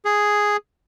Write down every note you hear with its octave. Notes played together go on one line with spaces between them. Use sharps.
G#4